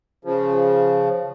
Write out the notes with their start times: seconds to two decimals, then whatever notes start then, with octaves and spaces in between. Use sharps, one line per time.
0.25 C#3 F3